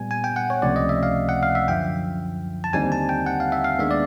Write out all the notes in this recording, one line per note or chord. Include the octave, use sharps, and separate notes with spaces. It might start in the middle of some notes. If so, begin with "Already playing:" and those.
Already playing: A#2 G3 B3 G#5
G#5
G5
F#5
C#5
C#2 C3 F3 A3 C#4 D5
D#5
E5
F5
F#5
F5
E5
F#2 D3 F3 G5
A5
D#2 D3 G3 C4 D#4 G#5
A5
G5
F#5
F5
E5
F5
D#2 D#3 G#3 B3 D4 E5
D5